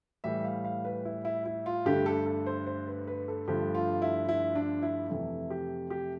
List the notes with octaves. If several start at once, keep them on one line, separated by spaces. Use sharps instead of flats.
A2 E3 G3 E5
F5
F5
B4
E4
E4
E4
F4
G2 D3 A3 G4
A4
A4
C5
C5
B4
B4
A4
G2 D3 F3 A3 G4
F4
E4
E4
D4
E4
F2 C3 E3 A3 E4
G4
G4